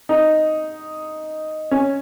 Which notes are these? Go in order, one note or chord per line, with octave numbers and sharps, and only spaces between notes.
D#4
C#4